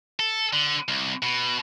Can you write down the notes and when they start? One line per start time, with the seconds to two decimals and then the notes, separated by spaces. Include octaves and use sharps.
0.19 A4
0.53 D3
0.88 C2
1.22 B2